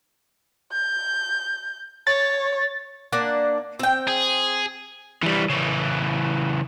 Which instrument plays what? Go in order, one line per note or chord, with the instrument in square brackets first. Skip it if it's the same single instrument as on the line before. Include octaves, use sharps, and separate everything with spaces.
[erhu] G6
[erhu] C#5 [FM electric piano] A6
[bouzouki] A#3 D4 F#5
C4 G5
[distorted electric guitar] G#4
[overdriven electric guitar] E3 G3
C#3 E3